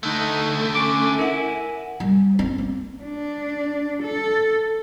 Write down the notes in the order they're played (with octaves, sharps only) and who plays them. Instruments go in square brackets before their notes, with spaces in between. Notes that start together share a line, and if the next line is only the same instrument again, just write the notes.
[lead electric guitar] D3 A3 [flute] D#4
[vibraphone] C#4 [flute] G#5 [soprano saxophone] D6
[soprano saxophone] E4 [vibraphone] A#4 F#5
[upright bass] G3
C4
A#3
[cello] D4
A4